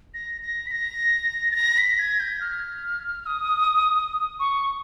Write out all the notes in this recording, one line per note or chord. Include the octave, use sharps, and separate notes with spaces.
A#6
A#6
B6
A#6
A6
A#6
B6
G#6
G6
F6
D#6
C#6